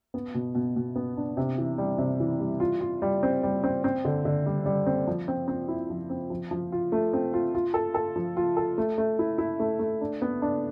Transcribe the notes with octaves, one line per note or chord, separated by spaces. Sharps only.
B3
B2
B2
B2
B3
D4
C3
E3
G3
C3
E3
G3
F4
F4
G3
C4
G3
C4
C4
D3
D3
G3
G3
C4
F3
C4
C4
E4
F3
C4
F3
F3
F4
A3
C4
F4
F4
A4
A4
F3
F4
A4
A3
A3
E4
E4
A3
A3
D4
B3
D4